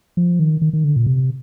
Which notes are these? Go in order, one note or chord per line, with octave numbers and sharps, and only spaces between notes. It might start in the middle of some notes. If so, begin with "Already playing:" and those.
F3
D#3
D#3
D#3
D3
A#2
C3